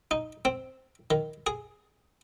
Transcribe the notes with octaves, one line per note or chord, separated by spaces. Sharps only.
D#4
C4
D#3
G#4